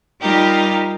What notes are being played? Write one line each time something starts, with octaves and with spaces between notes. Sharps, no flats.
G3 D#4 F4 G4 A#4